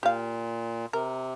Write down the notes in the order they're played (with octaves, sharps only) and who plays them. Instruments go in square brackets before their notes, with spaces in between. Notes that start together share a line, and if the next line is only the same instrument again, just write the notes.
[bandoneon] A#2 [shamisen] G4 F5
[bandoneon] C3 [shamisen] A#4